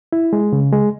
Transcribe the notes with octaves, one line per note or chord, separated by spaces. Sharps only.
E4
G#3
C#3
G#3